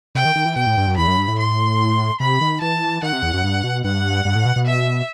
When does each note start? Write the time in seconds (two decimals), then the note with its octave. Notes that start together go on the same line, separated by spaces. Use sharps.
0.15 C3 G5
0.25 D#3
0.36 D#3
0.45 E3
0.55 B2 G5
0.66 A2
0.77 G2
0.87 F#2
0.96 E2 B5
1.08 F#2
1.18 G2
1.28 A2
1.39 C6
2.20 C3 B5
2.41 D#3
2.61 E3 A5
3.02 D#3 F#5
3.13 C3
3.22 E2
3.34 F#2
3.44 G2
3.64 B2
3.84 G2 F#5
4.25 G2
4.35 A2
4.45 B2
4.56 B2
4.66 E5